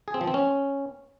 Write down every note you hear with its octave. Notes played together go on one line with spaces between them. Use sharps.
G#4
C4
F3
C4
C#4